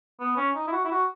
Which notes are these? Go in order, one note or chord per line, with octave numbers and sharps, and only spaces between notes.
B3
C#4
D#4
E4
F#4
E4
F#4